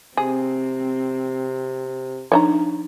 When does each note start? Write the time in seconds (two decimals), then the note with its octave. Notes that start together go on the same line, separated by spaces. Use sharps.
0.17 C3 C4 G#4
2.32 F3 D4 D#4 C#5 E5 A#5